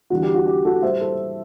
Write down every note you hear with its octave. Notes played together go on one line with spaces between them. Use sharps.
E2 D3 G3 F#4
G4
F#4
G4
F#4 A4
A2 G3 C5 E5
A4 C5